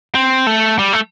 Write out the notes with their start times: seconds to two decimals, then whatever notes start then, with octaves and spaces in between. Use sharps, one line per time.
0.15 C4
0.47 A3
0.79 G3
0.93 A3